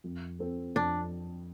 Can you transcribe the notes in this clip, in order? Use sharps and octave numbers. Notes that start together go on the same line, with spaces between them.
F2
F3 C4 A4
F2 D4